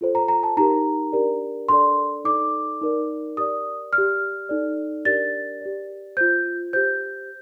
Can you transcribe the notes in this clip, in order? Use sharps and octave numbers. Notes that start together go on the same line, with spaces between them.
F4 A4 C5
A#5
A#5
A5
D#4 G4 A#4 A#5
D4 G4 A#4 D5
D4 A4 D5 C6
D#4 A4 D5 D6
D#4 A#4 D5
G4 A#4 D5 D#6
D5 F6
G4
D#4 A4 D5
D4 G4 A#4 D5 A6
G4 D5
F4 C5 G6
G4 C5 G6